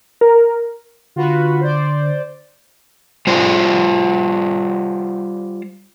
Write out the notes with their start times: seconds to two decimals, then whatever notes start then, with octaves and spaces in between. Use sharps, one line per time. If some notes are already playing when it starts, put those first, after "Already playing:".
0.21 A#4
1.16 D3 F4 F#4 B4
1.61 C5 D5
3.27 G3 F4 C5 D5